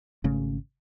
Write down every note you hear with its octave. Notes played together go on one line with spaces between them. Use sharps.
G#1 C#3 A3 C#4